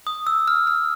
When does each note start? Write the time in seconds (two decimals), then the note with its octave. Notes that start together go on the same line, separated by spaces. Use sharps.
0.07 D#6
0.27 E6
0.48 F6
0.67 F6